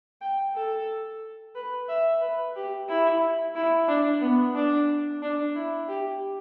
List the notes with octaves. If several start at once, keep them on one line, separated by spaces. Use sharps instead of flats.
G5
A4
B4
E5
B4
G4
E4
E4
D4
B3
D4
D4
E4
G4